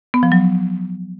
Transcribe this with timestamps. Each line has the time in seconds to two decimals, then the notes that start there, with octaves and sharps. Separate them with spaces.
0.14 B3
0.23 F3
0.32 F#3